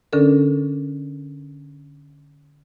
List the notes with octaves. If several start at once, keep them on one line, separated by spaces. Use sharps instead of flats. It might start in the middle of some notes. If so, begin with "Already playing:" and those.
D3 C#4 D4 A4 A#4